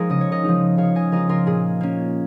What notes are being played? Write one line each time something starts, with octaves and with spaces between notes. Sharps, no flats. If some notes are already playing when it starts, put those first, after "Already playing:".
Already playing: F3 G#3 D#4 G#4 A#4
C#3 D#5
C#5
A#4 D#5
F3 G#3 D#4
C#3 C#5 F5
D#5 G#5
F3 G#3 D#4 A#4 D#5
F4 A#4
A#2 G#4
A#3 C#4